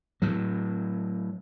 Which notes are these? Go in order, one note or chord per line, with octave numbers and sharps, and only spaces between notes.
A2 F#3